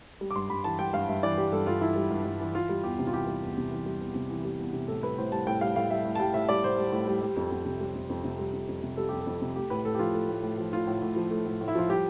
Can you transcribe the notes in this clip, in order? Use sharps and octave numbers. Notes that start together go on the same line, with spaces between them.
G3
D6
G2 C6
G2 B5
E3 A5
G3 G5
G2 F5
G2 E5
E3 D5
G3 G4
G2 A4
G2 F4
E3 E4
G3
G2
G2
E3
E3 F4
G3
E2 G4
C3
F4
E3 G4
G3
E2
C3
E3
G3
E2
C3
E3
G3
E2
C3
A2 A4
G3 B4
A2 C5
G3 A5
A2 G5
G3 F5
A2 F5
G3 E5
A2
A5
G3 G5
A2 E5
G3 D5
A2 C5
G3
A2
G3
G3
F2
F2
C3
G3
F2
F2
C3
G3
F2
F2
C3
G3 A4
F2 G4
A4
F2
C3
A3 G4
A2 B4
A2 A4
G4
F3 F4
A3
A2
A2
F3
A3 F4
A2
A2
F3
A3
A2
A2
E4
F3 F4
G3 G4